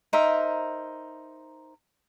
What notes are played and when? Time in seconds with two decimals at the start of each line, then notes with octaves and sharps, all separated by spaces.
0.13 D#4 A#4 C5 E5